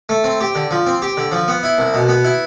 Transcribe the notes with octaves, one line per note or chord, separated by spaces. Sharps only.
A3
C4
G4
D3
F3
C4
G4
D3
F3
B3
E4
C2
B2
B3
E4